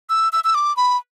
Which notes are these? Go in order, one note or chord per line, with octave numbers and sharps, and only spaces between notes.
E6
E6
E6
D6
B5